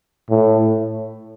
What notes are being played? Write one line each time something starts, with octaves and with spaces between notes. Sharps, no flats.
A2